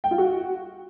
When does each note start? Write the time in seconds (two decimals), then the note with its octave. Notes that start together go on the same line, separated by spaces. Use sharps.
0.04 G5
0.11 F4
0.18 F#4